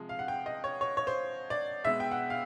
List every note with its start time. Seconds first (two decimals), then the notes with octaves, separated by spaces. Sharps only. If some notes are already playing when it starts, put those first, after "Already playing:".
Already playing: C3 F3 G#3
0.09 F5
0.19 F#5
0.28 G5
0.46 D#5
0.64 C#5
0.81 C#5
0.97 C#5
1.07 C5
1.50 D5
1.84 B2 G#3 E5
2.00 G5
2.11 F#5
2.30 F5